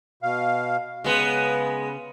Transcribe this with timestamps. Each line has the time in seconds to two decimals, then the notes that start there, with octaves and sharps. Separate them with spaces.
0.23 B2 F5
1.04 C#3 G#3 B3